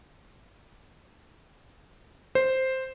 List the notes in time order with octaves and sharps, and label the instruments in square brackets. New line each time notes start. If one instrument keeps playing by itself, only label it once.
[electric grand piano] C5